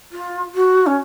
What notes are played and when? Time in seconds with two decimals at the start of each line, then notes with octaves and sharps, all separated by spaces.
0.12 F4
0.55 F#4
0.87 C#4